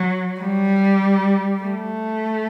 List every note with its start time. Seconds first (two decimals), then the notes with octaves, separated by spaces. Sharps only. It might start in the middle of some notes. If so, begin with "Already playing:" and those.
Already playing: F#3
0.40 G3
1.63 A3